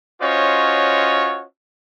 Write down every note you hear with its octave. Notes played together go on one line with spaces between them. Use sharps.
C#4 F4 F#4 C5 C#5 D#5